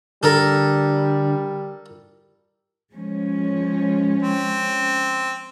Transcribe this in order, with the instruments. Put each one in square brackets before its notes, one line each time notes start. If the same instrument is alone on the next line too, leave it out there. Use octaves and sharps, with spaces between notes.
[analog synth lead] D3 [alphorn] G3 [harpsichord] A4 A#4
[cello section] F3 G#3 C#4
[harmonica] C4